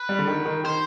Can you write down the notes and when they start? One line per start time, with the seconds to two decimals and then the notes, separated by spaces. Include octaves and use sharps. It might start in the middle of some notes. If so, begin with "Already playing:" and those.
Already playing: B4
0.09 G3
0.19 D3
0.27 D#3
0.46 D#3
0.64 D#3 C5